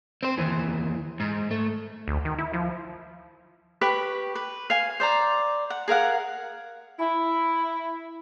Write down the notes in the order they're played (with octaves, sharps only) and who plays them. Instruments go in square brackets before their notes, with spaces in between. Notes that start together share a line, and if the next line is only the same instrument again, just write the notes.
[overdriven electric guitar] C4 C5
D#2 E3
G#2
A3
[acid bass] D2
D#3
E4
F3
[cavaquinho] G4 B4 B5 C#6
B4
F5 G#5
C5 D5 A#5
F#5
G#4 A#4 F5 F#5
[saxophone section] E4